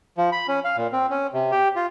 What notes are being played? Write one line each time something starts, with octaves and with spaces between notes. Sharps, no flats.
F3
B5
C#4
F5
A#2
C4
C#4
C3
G4
F4